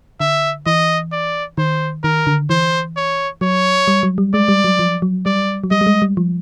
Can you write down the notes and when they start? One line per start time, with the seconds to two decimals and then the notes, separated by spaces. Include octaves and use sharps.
0.20 D3 E5
0.66 E3 D#5
1.12 D5
1.58 D#3 C5
2.04 D#3 A#4
2.27 D3
2.50 E3 C5
2.96 C#5
3.41 F#3 C#5
3.88 G3
4.03 F#3
4.18 G3
4.34 G#3 D5
4.48 G3
4.64 F#3
4.79 F3
5.02 F#3
5.26 G3 D5
5.64 F#3
5.71 G3 D#5
5.81 G3
5.87 G#3
6.02 G3
6.17 F3